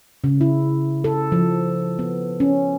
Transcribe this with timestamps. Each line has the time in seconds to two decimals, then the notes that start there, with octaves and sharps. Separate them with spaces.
0.24 C#3
0.41 E4
1.04 A4
1.32 F3
1.99 B3
2.40 C#4